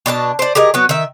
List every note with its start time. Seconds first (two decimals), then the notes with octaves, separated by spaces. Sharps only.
0.06 B2 D4 F#4 A5
0.39 C5 D5
0.55 G4 G#4 A#4 D#5
0.74 F#3 B3 F#4
0.89 D#3 E5